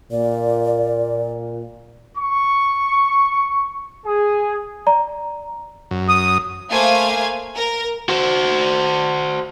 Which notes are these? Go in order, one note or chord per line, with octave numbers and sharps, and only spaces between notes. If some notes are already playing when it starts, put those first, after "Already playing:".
A#2 D5
C#6
G#4
D5 A#5
F#2
D#6
A3 A#3 C5 F5 G#5 G#6
A#4
F#4 C5